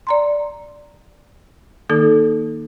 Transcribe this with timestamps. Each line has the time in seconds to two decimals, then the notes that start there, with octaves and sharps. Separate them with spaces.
0.07 D5 A#5 C6
1.90 D#3 A#3 D#4 A4